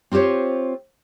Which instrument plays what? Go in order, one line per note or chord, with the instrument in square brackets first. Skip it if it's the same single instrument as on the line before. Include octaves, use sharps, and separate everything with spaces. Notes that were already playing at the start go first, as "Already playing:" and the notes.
[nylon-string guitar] C4 F4 G4 C5 C#5